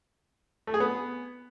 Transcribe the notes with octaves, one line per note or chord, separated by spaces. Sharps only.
A3
G#4
B3